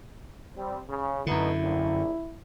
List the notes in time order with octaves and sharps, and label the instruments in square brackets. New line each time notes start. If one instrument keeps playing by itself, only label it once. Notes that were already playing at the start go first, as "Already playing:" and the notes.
[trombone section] G3 C4
C#3
[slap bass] F#2 D3 [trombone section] A3 B3 D#4 [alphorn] E4
[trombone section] A#1